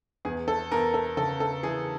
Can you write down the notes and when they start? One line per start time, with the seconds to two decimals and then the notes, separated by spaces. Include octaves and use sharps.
0.25 E2 G#4
0.48 A4
0.72 E2 A#4
0.94 A4
1.17 C#3 A4
1.40 A4
1.63 E3 G#4